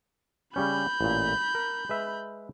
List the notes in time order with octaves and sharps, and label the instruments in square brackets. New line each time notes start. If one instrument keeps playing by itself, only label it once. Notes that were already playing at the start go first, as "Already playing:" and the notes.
[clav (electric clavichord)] C#3 G3 C#4 [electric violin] B5 G6
[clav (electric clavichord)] A1 A#2
A#4
G#3 B4 E5